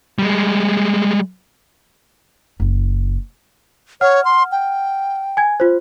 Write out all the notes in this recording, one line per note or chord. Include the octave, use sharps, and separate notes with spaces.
G3 G#3
F#1 E3
C#5 F#5 F6
C6
G5
G#5 G#6
F4 C5